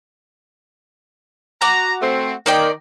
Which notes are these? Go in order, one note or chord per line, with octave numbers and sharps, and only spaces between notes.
F#4 A#5 D6
A3 C4
D#3 A#3 D5 G5